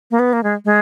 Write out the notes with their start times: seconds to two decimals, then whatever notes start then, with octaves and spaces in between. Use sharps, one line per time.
0.11 A#3
0.19 B3
0.33 A#3
0.43 G#3
0.65 G#3